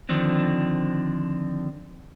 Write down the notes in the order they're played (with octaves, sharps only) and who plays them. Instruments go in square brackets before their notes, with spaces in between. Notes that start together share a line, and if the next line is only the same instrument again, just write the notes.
[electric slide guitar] D3 D#3 F3 C4 D4